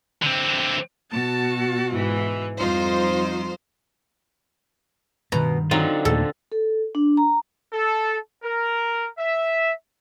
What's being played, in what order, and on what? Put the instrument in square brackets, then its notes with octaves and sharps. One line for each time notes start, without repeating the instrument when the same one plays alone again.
[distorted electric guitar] D3 C4
[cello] B2 F#4 [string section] A5
[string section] G#2 E3
[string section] F2 D#4 C5 [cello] G3 F4
[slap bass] G2 D#3 [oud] B2 [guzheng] A#5
[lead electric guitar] D3 F4 [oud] F#3 D#4 [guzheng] C4
[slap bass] D#2 A#2 A3 [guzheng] A4
[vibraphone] A4
D4
A#5
[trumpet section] A4
A#4
E5